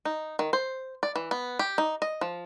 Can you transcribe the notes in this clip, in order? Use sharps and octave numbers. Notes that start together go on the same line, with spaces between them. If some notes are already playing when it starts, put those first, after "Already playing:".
D#4
D#3
C5
D5
E3
B3
G4
D#4
D#5
F3